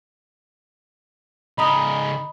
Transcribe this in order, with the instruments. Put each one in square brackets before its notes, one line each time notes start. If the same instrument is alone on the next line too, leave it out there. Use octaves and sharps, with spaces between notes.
[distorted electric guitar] C#3 D#4 [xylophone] D#5 A#5 D#6 [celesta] B5